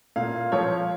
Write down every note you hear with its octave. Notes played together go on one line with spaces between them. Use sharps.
A#2 F5
F3 C#5